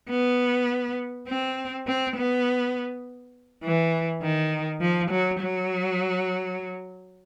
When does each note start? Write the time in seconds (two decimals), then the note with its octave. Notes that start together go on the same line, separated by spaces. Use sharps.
0.10 B3
1.28 C4
1.87 C4
2.16 B3
3.63 E3
4.22 D#3
4.81 F3
5.11 F#3
5.40 F#3